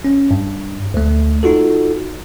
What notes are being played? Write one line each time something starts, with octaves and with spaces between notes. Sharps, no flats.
C#4
G2
D2 A3
D#4 F4 F#4 A4